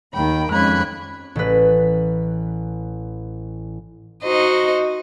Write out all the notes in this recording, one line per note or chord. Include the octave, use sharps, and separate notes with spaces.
D#2 D#3 G5 B5
F2 G#3 C#4 B5 F#6 G#6
A1 B4
D#4 F#4 C5 D#5